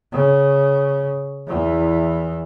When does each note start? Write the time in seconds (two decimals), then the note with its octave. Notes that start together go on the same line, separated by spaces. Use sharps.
0.12 C#3
1.47 E2 E3